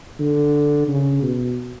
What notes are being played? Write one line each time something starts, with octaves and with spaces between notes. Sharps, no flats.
D3
C#3
B2